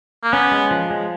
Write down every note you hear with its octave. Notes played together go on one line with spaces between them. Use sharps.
A#3
B3 C#4
G#3
F3
G#3